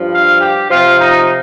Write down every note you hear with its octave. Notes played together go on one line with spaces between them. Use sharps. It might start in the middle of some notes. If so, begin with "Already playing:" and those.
Already playing: G2 F3
F5
G4
C3 F3 F4
D#4